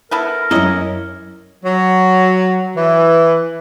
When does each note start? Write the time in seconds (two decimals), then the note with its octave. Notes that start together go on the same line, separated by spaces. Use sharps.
0.11 B3 E4 A4 A#4
0.51 F#2 A#3 C#4 E4 C#5 D#5
1.64 F#3
2.75 E3